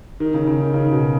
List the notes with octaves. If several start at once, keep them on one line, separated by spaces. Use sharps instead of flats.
D#3
C#3
C#3
D#3
C#3
B2